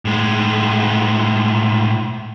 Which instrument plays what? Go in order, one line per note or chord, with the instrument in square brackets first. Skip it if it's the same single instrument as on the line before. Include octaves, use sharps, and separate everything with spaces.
[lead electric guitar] A2 G#3